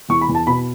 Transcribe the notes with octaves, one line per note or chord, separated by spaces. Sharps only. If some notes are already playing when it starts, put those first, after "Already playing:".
E2 C#6
B5
E2
A5
B2 B5